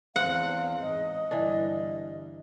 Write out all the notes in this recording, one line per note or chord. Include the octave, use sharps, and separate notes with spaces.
E2 C4 F5 F#5
E2 G#2 D#5
G1 E3 D4